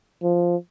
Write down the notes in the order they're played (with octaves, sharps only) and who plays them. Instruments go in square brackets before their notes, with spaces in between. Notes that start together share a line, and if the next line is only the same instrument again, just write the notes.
[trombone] F3